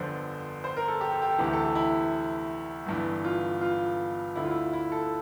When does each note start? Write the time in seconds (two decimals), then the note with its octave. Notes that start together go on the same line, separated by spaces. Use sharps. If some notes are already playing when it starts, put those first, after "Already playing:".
Already playing: G1 F2 D3 C5
0.64 C5
0.76 A#4
0.88 A4
1.01 G4
1.11 A4
1.22 G4
1.32 A4
1.38 D2 C3 E3 G4
1.53 A4
1.64 G4
1.75 E4
2.86 G1 G2 E3
3.25 F4
3.61 F4
4.35 D2 D3 E4
4.44 F4
4.51 E4
4.73 E4
4.92 A4